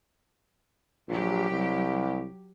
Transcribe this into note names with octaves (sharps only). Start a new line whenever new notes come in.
A#1 F#3 G4
C2